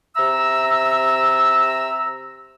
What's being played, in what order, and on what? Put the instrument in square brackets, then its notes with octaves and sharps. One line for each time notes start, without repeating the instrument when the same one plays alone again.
[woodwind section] C3 E5 A#5 E6